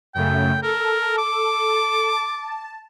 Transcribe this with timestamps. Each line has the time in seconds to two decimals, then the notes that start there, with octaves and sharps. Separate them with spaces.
0.15 F#2 C#3 A3 G5
0.63 A4 A#4
1.18 D6
2.11 A5